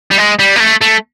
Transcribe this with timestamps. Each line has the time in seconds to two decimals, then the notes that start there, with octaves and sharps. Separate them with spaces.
0.11 G3
0.18 G#3
0.39 G3
0.56 A#3
0.60 A3
0.81 A3